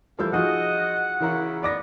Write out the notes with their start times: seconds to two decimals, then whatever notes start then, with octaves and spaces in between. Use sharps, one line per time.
0.19 E3 F3 G3 A#3 A4 E6 G6
0.33 F3 D#4 F4 F#4 G#4 D#5 F#5
1.20 C#3 E3 E4 A#4 A#5
1.63 B3 D5 D6 A#6